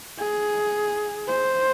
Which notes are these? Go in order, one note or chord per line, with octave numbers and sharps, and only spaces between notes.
G#4
C5